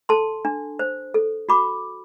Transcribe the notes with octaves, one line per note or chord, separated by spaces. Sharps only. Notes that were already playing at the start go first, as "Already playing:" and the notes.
A4 A5 C6
D4
C5
A4
F#4 B5 D6